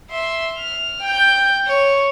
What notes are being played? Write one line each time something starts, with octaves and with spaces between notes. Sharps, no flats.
E5 C6
F6
G5 G6
C#5